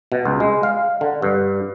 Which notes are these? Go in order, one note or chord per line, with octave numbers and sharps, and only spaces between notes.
B2
C#2
G#3
F5
D3
G2